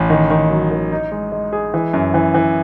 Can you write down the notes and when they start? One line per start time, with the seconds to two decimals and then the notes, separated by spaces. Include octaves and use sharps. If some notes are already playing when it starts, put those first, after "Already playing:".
Already playing: A1
0.10 D#3
0.30 D#3
0.50 F#3
0.71 D#3
0.92 D#4
1.12 G#3
1.32 G#3
1.53 G#4
1.74 E3
1.94 F#2
2.14 E3
2.34 E3